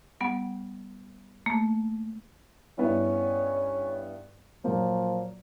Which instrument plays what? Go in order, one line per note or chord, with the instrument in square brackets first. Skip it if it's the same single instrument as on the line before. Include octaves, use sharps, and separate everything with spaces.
[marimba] G3 B3 F#5
A3 A#3
[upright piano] G2 B3 E4 [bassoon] C#4
[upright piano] A#2 F#3 A#3 [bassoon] F3